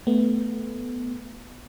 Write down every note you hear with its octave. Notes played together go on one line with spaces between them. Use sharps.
A3 B3